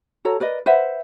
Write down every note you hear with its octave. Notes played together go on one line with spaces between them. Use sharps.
F#4 A4 C#5 A#5
A#4 B4 D5 D#5
B4 C5 E5 F#5